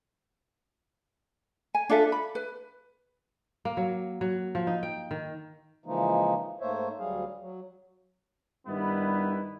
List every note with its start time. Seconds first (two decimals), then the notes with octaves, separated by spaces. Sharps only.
1.75 G#5
1.90 D4 F4 A4 E5
2.12 B5
2.35 B4
3.65 A#3
3.77 F#3
4.21 F#3
4.55 F3
4.67 D#4
4.83 G5
5.11 D#3
5.86 C#3 E3 F3 G#3 A#3 D#4
6.61 G#2 A3 A#3 C5 C#5 E5
6.99 D2 F#3 G3 G#4 F5
7.41 F#3
8.68 G2 D#3 G3 B3 E4 B4